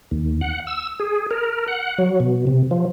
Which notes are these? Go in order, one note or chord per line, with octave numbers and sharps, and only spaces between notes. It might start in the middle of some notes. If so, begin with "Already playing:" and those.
D#2
F#5
E6
G#4
A#4
F#5
F#3
B2
C3
F3